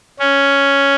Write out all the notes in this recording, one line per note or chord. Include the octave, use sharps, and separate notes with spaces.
C#4